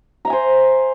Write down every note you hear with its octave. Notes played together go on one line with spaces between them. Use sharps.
C5 E5 G#5 A#5